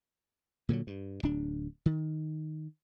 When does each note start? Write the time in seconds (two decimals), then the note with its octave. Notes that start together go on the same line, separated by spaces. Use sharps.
0.69 A#2 D3 E3 F#3
0.87 G2
1.23 D1 D4
1.86 D#3